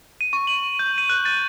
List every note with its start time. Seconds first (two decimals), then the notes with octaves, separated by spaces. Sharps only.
0.21 D#7
0.33 C#6
0.47 F#7
0.79 G6
0.98 D#7
1.09 F#6
1.25 A6